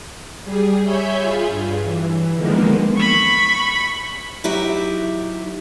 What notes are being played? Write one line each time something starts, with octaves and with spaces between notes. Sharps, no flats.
G3 G#4
C#5 E5 G#5 B5 G6
F4 G#4
G2
E3
D3 D#3 F3 G#3 A#3 B3
B5 C#6
F#3 D#4 E4 G4 E5